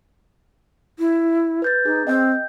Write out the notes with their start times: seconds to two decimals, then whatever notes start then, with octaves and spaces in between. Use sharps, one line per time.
0.99 E4
1.62 B4 G6 A6
1.86 D#4 G#4
2.07 C4 D#5 G5 G6